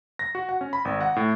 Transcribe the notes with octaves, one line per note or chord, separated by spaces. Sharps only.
A#6
F#4
F#5
C#4
B5
G#1
F#5
A2